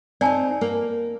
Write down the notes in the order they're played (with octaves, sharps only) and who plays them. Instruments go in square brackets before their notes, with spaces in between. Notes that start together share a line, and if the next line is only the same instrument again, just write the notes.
[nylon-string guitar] C4 D#4 [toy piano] D5 G#5 A5
[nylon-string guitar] A#3